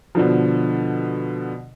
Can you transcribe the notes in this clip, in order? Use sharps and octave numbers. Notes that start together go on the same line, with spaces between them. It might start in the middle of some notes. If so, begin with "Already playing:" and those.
B2 D3 F3